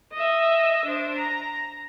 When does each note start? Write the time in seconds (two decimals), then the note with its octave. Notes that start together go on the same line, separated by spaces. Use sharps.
0.13 D#5 E5
0.85 D4 C5
1.18 A#5